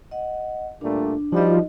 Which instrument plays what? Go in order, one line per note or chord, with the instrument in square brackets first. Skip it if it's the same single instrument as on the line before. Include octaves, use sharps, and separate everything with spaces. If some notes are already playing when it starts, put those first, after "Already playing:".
[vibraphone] D#5 F#5
[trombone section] A#2 G3 A3 [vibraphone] D4
[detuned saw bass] F3 [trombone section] G3 [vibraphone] D#4 F#4 D#5